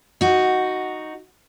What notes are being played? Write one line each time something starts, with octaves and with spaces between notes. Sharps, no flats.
D#4 F#4